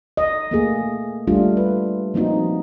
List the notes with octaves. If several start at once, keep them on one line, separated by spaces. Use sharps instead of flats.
D#5
A3 A#3 G#4
G3 A3 D4 F4
B4
F3 A#3 C4 D#4 F#4